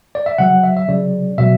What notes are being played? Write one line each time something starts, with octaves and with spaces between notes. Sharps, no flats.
D5
E5
C#3 F#3 F#5
E5
E5
C#3 F#3 D5
B2 F#3 E5